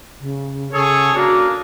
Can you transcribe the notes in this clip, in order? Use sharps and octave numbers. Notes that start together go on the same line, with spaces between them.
C#3
C#3 G#4 A4 C#5
A#3 D4 F#4